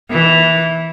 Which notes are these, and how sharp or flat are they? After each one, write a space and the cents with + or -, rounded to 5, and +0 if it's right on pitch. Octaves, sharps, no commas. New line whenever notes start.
E3 -10